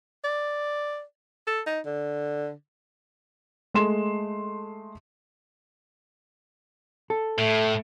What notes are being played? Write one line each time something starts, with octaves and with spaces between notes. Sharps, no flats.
D5
A4
D#4
D3
G#3 A3 C6 E7
A4
A2 A3